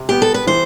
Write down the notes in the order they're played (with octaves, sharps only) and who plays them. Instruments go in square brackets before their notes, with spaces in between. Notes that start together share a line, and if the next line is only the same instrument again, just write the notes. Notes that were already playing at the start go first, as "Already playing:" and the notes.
Already playing: [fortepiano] C3
[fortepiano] B3 [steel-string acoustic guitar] G4
[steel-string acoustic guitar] A4
B4
[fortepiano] E3 [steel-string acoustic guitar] C5